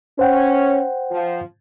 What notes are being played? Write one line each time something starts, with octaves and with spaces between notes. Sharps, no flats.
C#4 C5 F#5 G5
F3